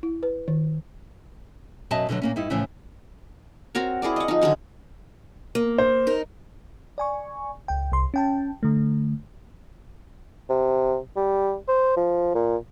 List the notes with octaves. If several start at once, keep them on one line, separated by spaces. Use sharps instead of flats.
E4
B4
D#3
F#2 B2 F#4 D#5 E5 A5
B2 D3 E3 F#3
A#2 A#3 C#4
G2 D#4 E4
A2 C#3 E3 F3 C#4 E4
C4 F#4 A#4 C#5
E4 G#4 A#4 D5
D#5 F#5
F3 D#4
D3 D#3 F#3 C#4
A#3
C5
D#4 A#4
D5 G#5 C#6
C#2 G5
C2 C6
C#4 G5 A5
D3 A3
C3
G3
C5
F3
A#2